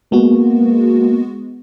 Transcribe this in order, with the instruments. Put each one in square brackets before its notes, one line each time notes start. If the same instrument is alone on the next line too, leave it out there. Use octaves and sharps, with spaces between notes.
[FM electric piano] G#3 B3 F#4 [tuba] A#3